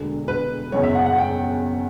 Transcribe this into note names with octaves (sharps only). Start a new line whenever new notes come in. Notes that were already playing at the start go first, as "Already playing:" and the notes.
Already playing: E1 D2 D3
B4
F#1 E2 C#3 C#5
E5
F#5
F#5
G5